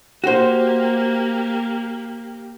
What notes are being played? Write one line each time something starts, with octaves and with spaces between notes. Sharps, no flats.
A#3 F#4 G4 C5